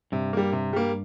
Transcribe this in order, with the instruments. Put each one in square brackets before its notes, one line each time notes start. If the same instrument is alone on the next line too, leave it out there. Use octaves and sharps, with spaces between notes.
[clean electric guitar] G2 [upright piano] C3
[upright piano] G3 A#3
C3
G3 A#3